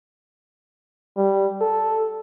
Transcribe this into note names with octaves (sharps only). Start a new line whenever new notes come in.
G3
A4